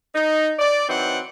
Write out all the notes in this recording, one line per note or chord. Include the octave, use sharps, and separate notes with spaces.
D#4
D5
E3 F#3 C4 D#4 F#5